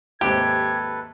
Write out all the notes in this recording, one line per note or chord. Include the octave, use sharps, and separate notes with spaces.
D#2 G#2 C3 G4 A4 B4 G#6